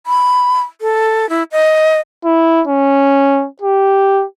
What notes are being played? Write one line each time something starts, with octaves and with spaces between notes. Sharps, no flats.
B5
A4
E4
D#5
E4
C#4
G4